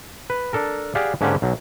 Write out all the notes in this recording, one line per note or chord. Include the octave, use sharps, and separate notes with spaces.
B4
D4 A4 A#4
G4 G#4 D5 F5 F#5
G#2 D3 A#3 C#4 G4 F#5
B1 F#3